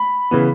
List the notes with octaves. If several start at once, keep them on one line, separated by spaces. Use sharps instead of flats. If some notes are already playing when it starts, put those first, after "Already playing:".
Already playing: B5
C#3 E3 B3